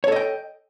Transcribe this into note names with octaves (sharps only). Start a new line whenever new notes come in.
A4 C#5 D#5 G5